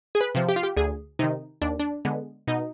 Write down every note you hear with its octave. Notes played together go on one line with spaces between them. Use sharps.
G#4
B4
C3 F3
G4
F4
G4
D2 G#4
C3 D#3 D#4
D#2 D4
D4
D3 G#3 B3
B2 D#4